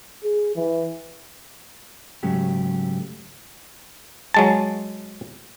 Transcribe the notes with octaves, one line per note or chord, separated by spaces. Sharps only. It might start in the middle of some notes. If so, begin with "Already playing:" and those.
G#4
E3
G#2 C#3 F#3 A3 G4
F#3 G#3 A5